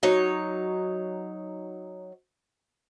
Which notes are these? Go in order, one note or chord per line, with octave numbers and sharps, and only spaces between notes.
F#3 D#4 C#5